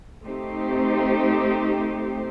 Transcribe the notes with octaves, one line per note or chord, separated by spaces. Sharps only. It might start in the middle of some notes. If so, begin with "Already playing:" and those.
A3 C4 D#4 G4 C5